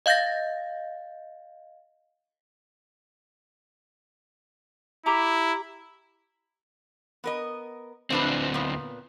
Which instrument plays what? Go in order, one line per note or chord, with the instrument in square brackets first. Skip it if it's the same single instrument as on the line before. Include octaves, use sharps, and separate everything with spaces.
[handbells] D#5 F5 G6 A6 A#6
[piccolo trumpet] E4 [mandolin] G4 A#5 D6
[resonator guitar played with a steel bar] B3 A#4 D#5
[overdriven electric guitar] D2 C4 [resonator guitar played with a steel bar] F3 D4 B4
[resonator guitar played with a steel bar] A#2 B3